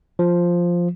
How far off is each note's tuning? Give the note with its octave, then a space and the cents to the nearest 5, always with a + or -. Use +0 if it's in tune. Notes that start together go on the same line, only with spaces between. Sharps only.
F3 +0